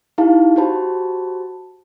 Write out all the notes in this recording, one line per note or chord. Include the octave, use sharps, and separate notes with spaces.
D#4 E4 G4 F5 A5
F#4 G4 C5 A5 B5